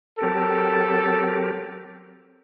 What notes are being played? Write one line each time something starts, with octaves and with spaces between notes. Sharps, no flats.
F#3 C4 G4 A4 A#4